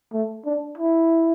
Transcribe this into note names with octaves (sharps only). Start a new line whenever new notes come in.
A3
D4
E4